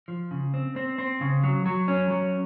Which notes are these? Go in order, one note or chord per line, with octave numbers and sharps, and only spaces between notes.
F3
C#3
C4
C4
C4
C#3
F#3
F#3
C#4
F#3